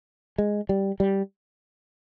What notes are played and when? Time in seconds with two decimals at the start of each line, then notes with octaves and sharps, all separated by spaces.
0.38 G#3
0.69 G3
1.00 G3